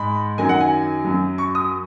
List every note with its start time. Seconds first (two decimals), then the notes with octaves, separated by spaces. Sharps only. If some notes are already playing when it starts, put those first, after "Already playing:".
Already playing: G#2 G#3 B5
0.38 F#2 D#3 F#3 G#5
0.49 F#5
0.60 G#5
1.05 F#2 F#3
1.38 C#6
1.55 D#6